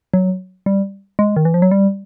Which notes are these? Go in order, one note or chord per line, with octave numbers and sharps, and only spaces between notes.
F#3
G3
G#3
D#3
E3
F3
F#3
G3